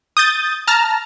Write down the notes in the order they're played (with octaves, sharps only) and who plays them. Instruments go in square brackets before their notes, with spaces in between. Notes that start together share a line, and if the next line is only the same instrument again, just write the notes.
[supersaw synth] D#6 G6 A6
A5 A#5 F6